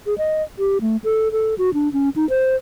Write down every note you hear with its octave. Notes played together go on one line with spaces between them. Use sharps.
G#4
D#5
G4
A3
A4
A4
F#4
D4
C#4
D#4
C5